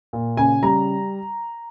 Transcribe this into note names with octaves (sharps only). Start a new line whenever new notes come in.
A#2
C#3 G#5
G3 A#5